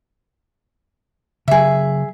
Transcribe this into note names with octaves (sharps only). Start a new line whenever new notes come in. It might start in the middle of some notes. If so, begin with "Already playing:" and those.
C#3 F#3 G#4 E5